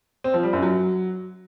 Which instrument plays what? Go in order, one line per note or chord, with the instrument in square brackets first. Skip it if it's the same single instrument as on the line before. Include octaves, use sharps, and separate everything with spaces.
[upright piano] C4
F3
G3
F#2
F#3